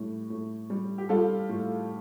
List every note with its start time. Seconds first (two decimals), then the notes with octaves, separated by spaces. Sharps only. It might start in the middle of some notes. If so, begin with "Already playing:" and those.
Already playing: A2 G3
0.30 A2
0.70 G3
0.98 G4
1.09 G3 F4 A4
1.49 A2